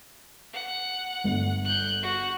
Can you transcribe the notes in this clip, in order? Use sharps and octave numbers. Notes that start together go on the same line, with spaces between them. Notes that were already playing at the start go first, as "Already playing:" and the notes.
F#5
G1
F#6 G6
F#4